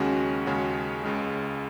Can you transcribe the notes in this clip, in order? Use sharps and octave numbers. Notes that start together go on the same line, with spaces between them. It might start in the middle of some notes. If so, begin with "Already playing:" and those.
Already playing: D#2 C#3 G#3 C#4 F#4
D#2 C#3 G#3 C#4 F#4
C#2 C#3 G#3